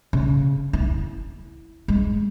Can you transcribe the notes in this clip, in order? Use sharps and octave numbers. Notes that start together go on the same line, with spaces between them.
C#3
E4
G#3